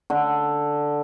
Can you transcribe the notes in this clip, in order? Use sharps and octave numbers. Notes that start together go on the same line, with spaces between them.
D3